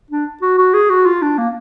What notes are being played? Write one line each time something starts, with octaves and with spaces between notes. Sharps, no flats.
D4
F#4
F#4
G#4
F#4
F4
D4
A#3